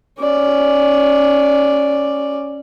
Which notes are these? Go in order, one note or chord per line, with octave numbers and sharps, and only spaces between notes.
C#4 D5